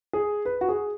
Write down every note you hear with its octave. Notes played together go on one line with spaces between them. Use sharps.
G#4
B4
F#4
G#4